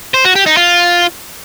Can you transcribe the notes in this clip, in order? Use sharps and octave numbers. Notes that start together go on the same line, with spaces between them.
C5
F#4
G4
D#4
F4